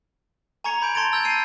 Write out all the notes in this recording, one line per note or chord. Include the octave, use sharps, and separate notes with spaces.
G#5 A#5 C#6 G#6 C#7 F7
B5 G6 D7
A5 C6 G#6 A6 D7 F7
A5 E6 G6 A6
E6 G6 A6 C7 C#7 D#7